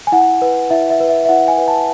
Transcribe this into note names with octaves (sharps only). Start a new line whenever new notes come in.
G#5
E4 F#5
B4
E4 E5
E5
B4
E5
E5
E4 F#5
G#5
B4
A5